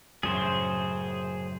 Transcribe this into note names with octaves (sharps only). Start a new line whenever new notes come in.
F#2 A2 C#3 G#4 C5